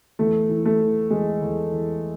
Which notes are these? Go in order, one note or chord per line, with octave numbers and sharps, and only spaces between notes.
E2 A3
E3
A3
E3
E2 G#3
E2
E2